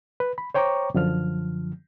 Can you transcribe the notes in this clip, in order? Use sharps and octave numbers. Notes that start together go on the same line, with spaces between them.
B4
B5
C5 C#5 G5 A#5 C#6 D6
F#2 D3 F3 F6